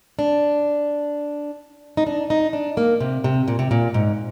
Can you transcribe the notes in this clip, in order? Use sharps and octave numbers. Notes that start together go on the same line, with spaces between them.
D4
D#4
D4
D#4
D4
A#3
C3
C3
A#2
C3
A#2
G#2